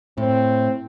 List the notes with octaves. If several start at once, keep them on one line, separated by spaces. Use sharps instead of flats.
A2 C4